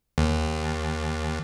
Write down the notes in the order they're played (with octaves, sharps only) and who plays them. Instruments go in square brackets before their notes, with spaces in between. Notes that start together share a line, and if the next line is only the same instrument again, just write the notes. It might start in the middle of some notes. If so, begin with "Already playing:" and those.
[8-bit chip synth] D#2